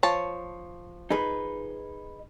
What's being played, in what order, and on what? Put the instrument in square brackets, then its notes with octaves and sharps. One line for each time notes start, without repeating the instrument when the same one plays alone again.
[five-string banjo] F3 C#5 A5
[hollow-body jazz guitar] D#4 G#4 B4